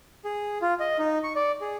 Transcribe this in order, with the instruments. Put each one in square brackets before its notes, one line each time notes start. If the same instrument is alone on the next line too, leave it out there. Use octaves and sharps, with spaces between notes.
[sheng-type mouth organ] G#4
F4
D#5
D#4
C#6
D5
G#4